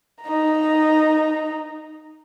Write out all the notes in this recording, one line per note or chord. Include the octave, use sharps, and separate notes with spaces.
D#4 A#5